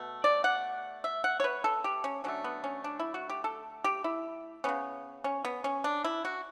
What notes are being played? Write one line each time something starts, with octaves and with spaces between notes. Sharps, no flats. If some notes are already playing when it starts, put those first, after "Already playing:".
Already playing: B2 A3
D5
F#5
E5
F#5
C#5
B4
A4
G4
C#4
D3 F#3 A3 C#4
B3
C#4
D4
E4
F#4
G4
A4
G4
E4
C#3 F#3 B3 C#4
C#4
B3
C#4
D4
E4
F#4